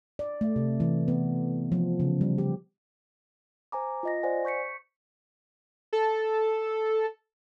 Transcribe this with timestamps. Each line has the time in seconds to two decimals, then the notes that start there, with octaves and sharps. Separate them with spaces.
0.19 D5
0.41 A3
0.56 C3
0.80 E3
1.08 B3
1.72 F3
2.00 C#3
2.21 G3
2.38 G4
3.72 C5 G#5 A#5 D6
4.03 F4 D#5 A#6
4.23 C5 D5 F#5 G#5
4.45 C#6 G6 B6 C#7
5.93 A4